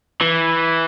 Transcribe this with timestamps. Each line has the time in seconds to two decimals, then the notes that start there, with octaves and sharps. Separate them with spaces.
0.22 E3